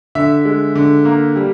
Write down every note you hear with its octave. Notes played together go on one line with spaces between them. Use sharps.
D3 E5
G#3
D3
A#3
G3